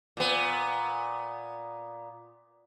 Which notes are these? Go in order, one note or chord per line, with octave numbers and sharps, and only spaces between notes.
A#2 B3